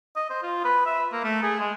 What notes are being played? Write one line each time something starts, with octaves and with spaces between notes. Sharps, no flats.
D#5
C5
F4
B4
E5
A#3
A3
G#4
G#3